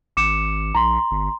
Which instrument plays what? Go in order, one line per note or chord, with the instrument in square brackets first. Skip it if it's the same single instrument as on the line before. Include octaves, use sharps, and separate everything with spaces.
[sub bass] G#1 [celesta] D6 C#7 E7
[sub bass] A#1 [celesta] A#5 C6
[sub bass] G1